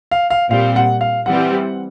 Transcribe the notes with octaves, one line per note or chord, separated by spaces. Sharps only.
F5
F5
A#2 G3 C4 F5
F#5
F5
E3 G3 C4 F#5